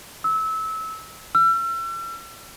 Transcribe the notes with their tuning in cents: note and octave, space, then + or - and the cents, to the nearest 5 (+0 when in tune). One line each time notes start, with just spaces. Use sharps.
E6 -25
E6 +40